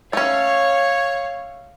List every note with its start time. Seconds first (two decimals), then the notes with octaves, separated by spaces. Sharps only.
0.13 A3 C#4 C#5 F5